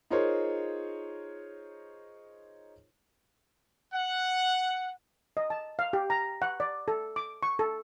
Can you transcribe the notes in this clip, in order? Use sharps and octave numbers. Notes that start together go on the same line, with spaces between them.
D#4 F4 G#4 A#4 C5 C#5
F#5
D#5
A5
F5
G4
A#5
F#5
D5
A4
D6
C#6
A4